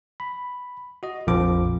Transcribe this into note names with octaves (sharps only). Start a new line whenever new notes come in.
B5
F#4 D#5
A#1 F2 F3 D6